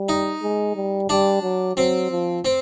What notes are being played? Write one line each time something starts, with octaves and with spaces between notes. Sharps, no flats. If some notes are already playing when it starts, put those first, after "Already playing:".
Already playing: G3
D#4
G#3
G3
G3 D4
F#3
F#3 C4
F3
C4